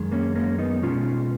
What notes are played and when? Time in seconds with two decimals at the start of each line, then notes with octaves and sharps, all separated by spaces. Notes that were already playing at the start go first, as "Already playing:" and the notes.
Already playing: F#2 D#3 G#3
0.12 A#3 C#4
0.35 A#3 C#4
0.58 B3 D#4
0.82 B2 G#3 C#4 F4